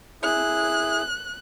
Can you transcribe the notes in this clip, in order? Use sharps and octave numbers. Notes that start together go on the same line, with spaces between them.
E4 G#4 F#6